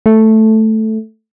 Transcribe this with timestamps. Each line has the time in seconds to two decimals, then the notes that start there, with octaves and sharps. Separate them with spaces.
0.06 A3